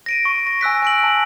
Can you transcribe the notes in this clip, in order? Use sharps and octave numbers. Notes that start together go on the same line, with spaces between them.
A#6 D7 D#7
C#6
A#6
G#5 E6 F#6 B6
G#5 D7 F#7
A5